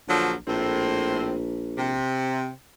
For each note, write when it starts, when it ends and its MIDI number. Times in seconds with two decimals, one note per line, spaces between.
0.08 0.36 34
0.08 0.32 50
0.08 0.32 53
0.08 0.32 54
0.47 2.01 34
0.47 1.36 45
0.47 1.36 60
1.77 2.49 48